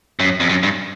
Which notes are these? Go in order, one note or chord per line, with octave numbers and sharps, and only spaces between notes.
F#2
F2
F#2
G2